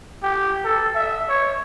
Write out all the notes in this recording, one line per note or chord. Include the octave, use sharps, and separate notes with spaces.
G4
A4
E5
C#5